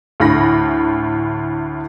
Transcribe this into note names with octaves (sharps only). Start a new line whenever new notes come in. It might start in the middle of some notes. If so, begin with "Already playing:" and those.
D2 A2 B5 A#6